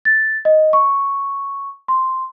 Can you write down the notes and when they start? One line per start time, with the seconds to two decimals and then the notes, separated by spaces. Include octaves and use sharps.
0.05 A6
0.45 D#5
0.73 C#6
1.88 C6